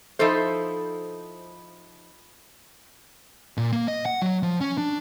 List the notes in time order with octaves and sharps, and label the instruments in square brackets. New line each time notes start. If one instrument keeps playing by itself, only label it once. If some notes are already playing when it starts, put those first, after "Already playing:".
[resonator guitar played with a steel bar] F3 D#4 E4 A4 C5
[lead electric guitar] A#2
A#3
D#5
F#5
F#3
F3
C#4
D4